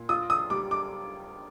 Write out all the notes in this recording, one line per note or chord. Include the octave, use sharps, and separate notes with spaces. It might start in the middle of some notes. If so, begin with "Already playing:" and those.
Already playing: A#2
F4 D#6
D#6
G3 D6
D6